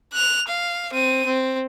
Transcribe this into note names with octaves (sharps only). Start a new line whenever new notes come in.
F#6 F7
F5
C4 D#7
C4